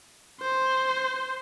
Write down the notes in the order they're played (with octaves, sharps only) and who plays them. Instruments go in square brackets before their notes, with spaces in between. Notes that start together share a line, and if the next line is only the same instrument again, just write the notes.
[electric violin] C5